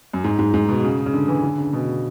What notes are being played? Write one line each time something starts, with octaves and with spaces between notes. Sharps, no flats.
F#2
G#2
G#2
G#2
B2
C#3
C#3
D3
E3
D3
C#3
B2